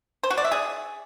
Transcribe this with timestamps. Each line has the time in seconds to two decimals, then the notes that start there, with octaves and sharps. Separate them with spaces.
0.23 C5
0.30 F#4
0.38 D5
0.45 E5
0.52 G#4